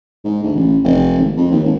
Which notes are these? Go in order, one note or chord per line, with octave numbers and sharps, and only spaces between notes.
G#2
D2
A1
F1
G#1
F2
D#2
G#1